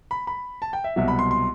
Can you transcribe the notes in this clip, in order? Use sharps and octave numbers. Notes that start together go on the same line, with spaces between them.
B5
B5
A5
G5
E5
C2 B2 F#3 E5
B5
C6
C6